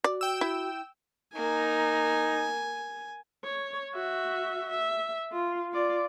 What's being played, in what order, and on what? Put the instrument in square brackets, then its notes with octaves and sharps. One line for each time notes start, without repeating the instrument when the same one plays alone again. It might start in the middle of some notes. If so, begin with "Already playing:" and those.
[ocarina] F#4 [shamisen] D5
[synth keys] G5 E6
[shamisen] E4
[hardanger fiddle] A#3 [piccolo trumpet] D#4 [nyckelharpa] G#5
[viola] C#5
F#4 E5
E5
F4
F4 D5